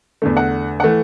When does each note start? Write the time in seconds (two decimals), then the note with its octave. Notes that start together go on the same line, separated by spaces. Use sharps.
0.22 E2 D3 A3
0.37 F#5
0.80 E3 A3 F#5